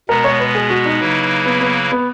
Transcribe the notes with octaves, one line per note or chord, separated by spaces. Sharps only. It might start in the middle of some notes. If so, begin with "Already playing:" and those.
B2 G#3 B3 A#4
C#5
B4
G#4
F#4
D#4
C#3 F#3 A#3 E4 B4
B3
B3
B3